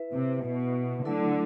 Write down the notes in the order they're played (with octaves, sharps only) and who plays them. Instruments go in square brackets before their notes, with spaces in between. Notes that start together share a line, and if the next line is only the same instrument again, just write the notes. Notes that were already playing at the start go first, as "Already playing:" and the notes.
Already playing: [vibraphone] E4 B4 E5
[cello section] C3
B2
[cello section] D3 [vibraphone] F#3 A3 E4 A4